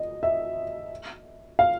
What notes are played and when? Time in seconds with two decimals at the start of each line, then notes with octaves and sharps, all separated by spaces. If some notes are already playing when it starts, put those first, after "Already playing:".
Already playing: D#5
0.23 E5
1.59 F5